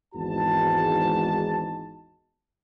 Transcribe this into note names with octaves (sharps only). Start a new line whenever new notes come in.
G#1 E2 G#2 F#4 A5